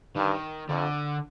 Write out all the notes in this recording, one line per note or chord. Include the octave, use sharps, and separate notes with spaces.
G2 D#3
F2 D3